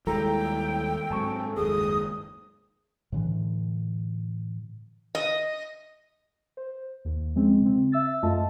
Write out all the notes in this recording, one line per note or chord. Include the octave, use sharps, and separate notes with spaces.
D#2 G3 G#3 E4 A4 G5 A#5
G#2 F#3 C4 G#5 A5 C#6
F#1 D#2 G#2 G#4 D#6
A2 D3 E3
D#5
C5
D#2
F3 G#3 C4 C#4
C#3 C4
E5 E6 A6
F#2 A3 F4 D#5 A5